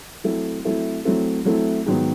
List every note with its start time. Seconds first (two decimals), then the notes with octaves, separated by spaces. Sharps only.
0.24 F#3 A3 C4 E4 A4
0.65 F#3 A3 C4 E4 A4
1.05 F#3 A3 C4 E4 A4
1.45 F#3 A3 C4 E4 A4
1.86 G#2 D#3 F#3 B3